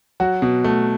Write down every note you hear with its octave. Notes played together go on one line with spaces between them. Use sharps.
F#3 F#4
B2
A3